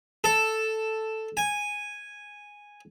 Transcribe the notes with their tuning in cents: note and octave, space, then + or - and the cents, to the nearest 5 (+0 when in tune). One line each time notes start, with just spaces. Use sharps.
A4 +0
G#5 -5